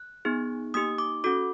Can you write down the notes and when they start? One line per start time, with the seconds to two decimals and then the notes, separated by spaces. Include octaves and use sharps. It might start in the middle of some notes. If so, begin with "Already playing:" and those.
Already playing: F#6
0.25 B3 D#4 G#4
0.74 A#3 D#4 G4 D#6
0.98 D6
1.24 C#4 F#4 A4 D6